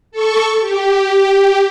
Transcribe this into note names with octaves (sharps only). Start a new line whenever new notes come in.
A4 C#6
G4